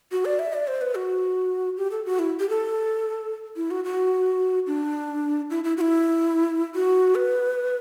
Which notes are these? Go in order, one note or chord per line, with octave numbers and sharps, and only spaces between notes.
F#4
D5
E5
D5
C5
B4
F#4
G4
A4
F#4
E4
G4
A4
E4
F#4
F#4
D4
E4
E4
F#4
E4
F#4
B4